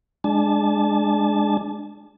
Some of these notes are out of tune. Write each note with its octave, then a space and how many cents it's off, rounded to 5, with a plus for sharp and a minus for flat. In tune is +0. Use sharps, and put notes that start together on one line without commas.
G#3 +0 D4 +10 A5 -25